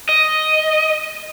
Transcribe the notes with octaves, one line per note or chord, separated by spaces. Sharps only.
D#5